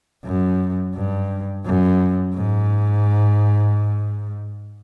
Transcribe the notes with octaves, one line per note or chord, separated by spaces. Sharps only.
F#2
G2
F#2
G#2